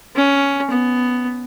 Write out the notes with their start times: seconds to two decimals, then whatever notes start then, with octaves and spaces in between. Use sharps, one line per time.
0.15 C#4
0.70 B3